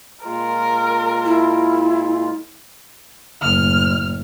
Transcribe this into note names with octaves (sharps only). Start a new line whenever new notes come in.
A#2 G#3 F4 A#4
E4
F#1 A2 F6